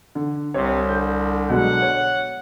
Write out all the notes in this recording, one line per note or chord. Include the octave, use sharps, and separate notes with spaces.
D3
C2 C3 C#5
D3 G6
B2 F#3 G#3 F#5
C#5